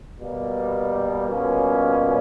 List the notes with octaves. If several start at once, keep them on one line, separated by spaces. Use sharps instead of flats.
B2 G3 A#3
B2 G3 A#3 C#4 F4